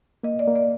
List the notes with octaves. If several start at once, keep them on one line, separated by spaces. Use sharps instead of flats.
A#3 D#5
D5
A#3
D5